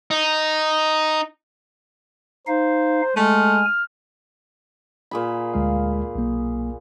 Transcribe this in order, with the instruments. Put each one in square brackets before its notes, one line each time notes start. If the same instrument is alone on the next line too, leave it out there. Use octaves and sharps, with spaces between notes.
[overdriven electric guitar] D#4
[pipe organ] D#4 F5 [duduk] C5
[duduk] G#3 [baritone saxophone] A3 [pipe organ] G#5 [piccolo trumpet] F6
[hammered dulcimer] A#2 G#4 B5
[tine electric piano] D2 G#3 F5
B1 A#3